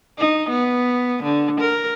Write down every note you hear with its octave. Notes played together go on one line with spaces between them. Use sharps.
D#4
B3
D3
A#4